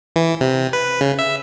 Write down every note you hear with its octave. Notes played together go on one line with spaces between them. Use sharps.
E3
C3
B4
C#3
E5